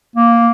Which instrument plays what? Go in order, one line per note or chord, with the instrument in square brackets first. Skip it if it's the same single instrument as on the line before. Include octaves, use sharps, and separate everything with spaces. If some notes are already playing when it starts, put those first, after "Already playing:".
[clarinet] A#3